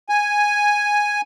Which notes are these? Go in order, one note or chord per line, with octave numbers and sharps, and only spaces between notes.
G#5